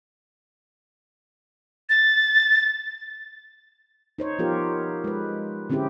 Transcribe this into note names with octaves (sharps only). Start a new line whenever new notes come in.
A6
D#4 C5 C#5
F3 B3 F4 G4 A#4
G#3 B4
D3 C4 C#4 E4 G4 G#4